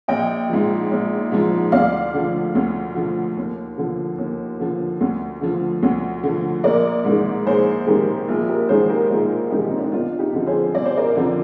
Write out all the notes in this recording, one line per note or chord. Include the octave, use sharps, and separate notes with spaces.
A#1 D#5 G5
G#2 F3
A#1
G#2 F3
D2 D5 F5
D3 F3
D2
D3 F3
D#2
D3 F3
D#2
D3 F3
D2
D3 F3
D2
D3 F3
A#1 A#4 D5
G#2 D#3
A#1 G#4 C5
G#2 D#3 G4 A#4
A#1 F4 G#4
G4 A#4
G#2 D#3 G#4 C5
G4 A#4
A#1 F4 G#4
G#2 D#3 D#4 G4
C4
D4
D#4
G1 D4 F4
D#4 G4
F2 D3 F3
G#4 C5
G1 D5
C5
A#4 D5
F2 D3 F3